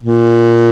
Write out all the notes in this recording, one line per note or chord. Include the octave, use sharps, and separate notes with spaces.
A#2